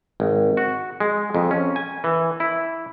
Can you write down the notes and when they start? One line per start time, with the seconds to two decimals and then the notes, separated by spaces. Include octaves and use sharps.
0.20 G#1
0.57 F#4
1.00 G#3
1.34 F2
1.51 C#4
1.76 G#5
2.04 E3
2.40 E4